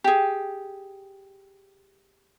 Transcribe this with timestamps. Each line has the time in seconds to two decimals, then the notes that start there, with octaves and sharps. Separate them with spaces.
0.04 G4 G#4